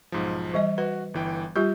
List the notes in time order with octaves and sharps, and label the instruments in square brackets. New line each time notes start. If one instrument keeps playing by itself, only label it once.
[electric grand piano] B1 G#2 F3
[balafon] E3 G3 D#5
[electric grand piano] F#4 [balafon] B4
[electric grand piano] G1 E3 G5
[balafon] G3 F4 G4 [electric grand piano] G6